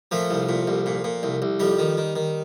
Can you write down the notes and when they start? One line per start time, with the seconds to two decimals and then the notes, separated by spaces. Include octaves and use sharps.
0.11 A#2 F3 A3
0.31 C2
0.49 A#2
0.68 C2
0.86 A#2
1.04 A#2
1.23 C2
1.42 C2
1.60 F2 G3
1.79 D#3
1.97 D#3
2.16 D#3